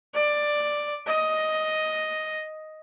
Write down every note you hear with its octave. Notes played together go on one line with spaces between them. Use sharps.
D5
D#5